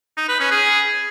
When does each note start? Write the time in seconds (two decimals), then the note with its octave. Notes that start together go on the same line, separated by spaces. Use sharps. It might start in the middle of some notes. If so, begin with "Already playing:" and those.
0.17 D#4
0.29 B4
0.40 C#4
0.51 G#4